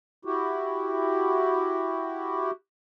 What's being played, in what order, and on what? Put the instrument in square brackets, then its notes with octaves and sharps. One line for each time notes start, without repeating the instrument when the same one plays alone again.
[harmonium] E4 F#4 G4